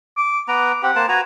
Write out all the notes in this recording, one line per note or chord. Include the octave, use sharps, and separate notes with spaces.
D6
B3 B4 A#5 D6
C4 G4 F#5
A#3 C5 A5
F#4 B4 G#5 A#5